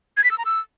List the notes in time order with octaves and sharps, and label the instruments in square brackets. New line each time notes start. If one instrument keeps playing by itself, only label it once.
[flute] G#6
B6
E6
A#5
E6